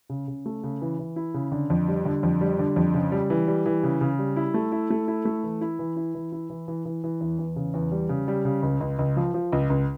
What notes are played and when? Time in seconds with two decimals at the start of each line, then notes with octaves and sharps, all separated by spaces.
0.09 C#3
0.28 C#3
0.46 A3
0.63 C#3
0.82 E3
0.99 E3
1.16 E4
1.34 C#3
1.52 D3
1.70 F2
1.88 G3
2.05 D3
2.23 F2
2.41 G3
2.59 D3
2.76 F2
2.94 C#3
3.12 G3
3.30 E3
3.48 G3
3.66 E3
3.83 C#3
4.01 C#3
4.19 G3
4.36 E4
4.54 A3
4.72 E4
4.90 A3
5.08 E4
5.25 A3
5.44 E3
5.61 E4
5.79 E3
5.96 E4
6.15 E3
6.32 E4
6.50 E3
6.68 E3
6.85 E3
7.04 E3
7.21 E2
7.39 E2
7.56 C#3
7.74 E2
7.92 G3
8.09 C#3
8.28 G3
8.45 C#3
8.63 C#2
8.81 C#2
8.99 C#2
9.16 F3
9.34 F3
9.53 C#2
9.70 C#2